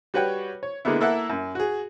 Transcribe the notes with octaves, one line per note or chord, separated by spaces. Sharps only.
G3 F#4 B4 C#5 F#5 G5
C#5
D3 G#3 A#3 B3 E4
A#3 E4 A4 A#4 E5 F#5
F#2
F#4 G#4